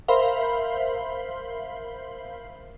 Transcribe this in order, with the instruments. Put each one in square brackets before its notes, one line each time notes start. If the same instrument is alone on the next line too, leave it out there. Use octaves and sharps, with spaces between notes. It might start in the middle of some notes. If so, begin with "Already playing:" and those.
[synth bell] A#4 C5 E5 F5 B5 C6